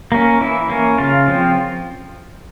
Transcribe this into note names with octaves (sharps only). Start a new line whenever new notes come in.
A#3 C#4
E3 E4
A#3 C#4
C#3 F4
F3 C4